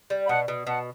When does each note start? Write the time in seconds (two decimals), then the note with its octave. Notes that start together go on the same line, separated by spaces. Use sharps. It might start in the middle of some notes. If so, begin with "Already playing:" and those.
0.10 G3
0.25 B5
0.29 B2 F#5 A5
0.48 B2
0.67 B2 F#5 A5